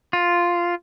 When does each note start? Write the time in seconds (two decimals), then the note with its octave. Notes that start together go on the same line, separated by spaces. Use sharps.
0.13 F4